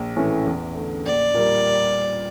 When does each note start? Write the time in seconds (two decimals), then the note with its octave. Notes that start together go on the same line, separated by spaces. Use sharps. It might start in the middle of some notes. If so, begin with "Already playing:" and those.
Already playing: A#1
0.16 A2 E3 A3 C#4
0.46 E2
0.75 D3 A3
1.05 A#1 D5
1.34 A#2 G3 A#3